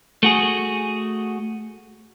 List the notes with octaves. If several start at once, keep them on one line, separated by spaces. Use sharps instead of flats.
A3 F#4 G#4